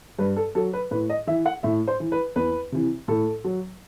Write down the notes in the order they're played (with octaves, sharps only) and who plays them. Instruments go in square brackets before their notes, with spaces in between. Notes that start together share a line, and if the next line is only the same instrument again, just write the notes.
[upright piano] G2 B4
A4
F#3 A4
B4
A2 B4
D#5
E3 E5
F#5
A2 E5
C5
E3
B4
E2 B4
C3 E3
A2 A4
F#3